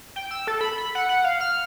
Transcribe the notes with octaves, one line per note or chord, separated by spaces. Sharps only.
G5
E6
A4
B5
B5
F#5
F#5
F5
F6